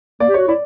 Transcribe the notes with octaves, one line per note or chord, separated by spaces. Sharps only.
A#3 D5
G4
F#4 C#5
E4 D5